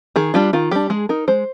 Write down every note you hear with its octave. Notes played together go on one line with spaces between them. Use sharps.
D#3 G#4
G3 D4 F4
D#3 F4
G3 D4 G4
G#3 G#4
D#4 A#4
G#3 C5